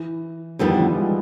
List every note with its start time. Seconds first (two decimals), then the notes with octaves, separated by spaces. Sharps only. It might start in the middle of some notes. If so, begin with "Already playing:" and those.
Already playing: E3
0.59 F2 D3 D#3 G3 B3
0.69 E3
0.78 F3
0.87 G3
0.96 G#3